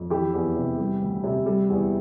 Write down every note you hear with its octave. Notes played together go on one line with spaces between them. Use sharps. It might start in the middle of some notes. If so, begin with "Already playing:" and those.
Already playing: F2
E3 E4 G4
E2
C3
G3
D2
C3
G3
E2